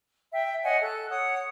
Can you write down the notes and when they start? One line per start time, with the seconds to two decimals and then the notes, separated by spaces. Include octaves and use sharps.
0.32 E5 G5
0.63 C#5 D#5 F#5 G#5
0.82 A4 F#6
1.10 C#5 F#5 D#6